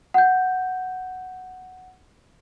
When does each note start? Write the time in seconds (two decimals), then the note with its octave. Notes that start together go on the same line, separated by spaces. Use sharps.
0.14 F#5 G6